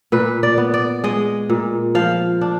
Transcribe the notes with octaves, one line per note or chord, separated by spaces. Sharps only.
A#2 B4
D5
B3
D5
G#3 D#5
A#2
F3 F5
D4